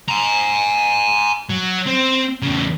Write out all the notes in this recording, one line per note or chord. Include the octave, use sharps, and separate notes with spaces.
G#5 A#5
F#3
C4
E2 C#3